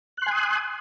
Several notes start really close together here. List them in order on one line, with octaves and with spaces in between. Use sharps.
F#6 C6 G#5 D#6